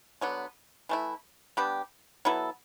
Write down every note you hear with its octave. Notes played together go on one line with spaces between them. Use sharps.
D3 F#3 B3
E3 A3 E4
G3 B3 D4 G4
F#3 B3 E4 A4